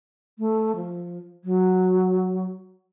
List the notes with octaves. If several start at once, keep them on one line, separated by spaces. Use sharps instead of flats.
A3
F3
F#3